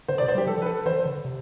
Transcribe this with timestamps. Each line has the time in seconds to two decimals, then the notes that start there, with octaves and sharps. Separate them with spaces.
0.08 D3 C5
0.18 D5
0.21 C3
0.28 C5
0.35 G3
0.38 G4
0.47 F3 A4
0.62 B4
0.66 A4
0.86 E3 C5
1.06 D3
1.25 C3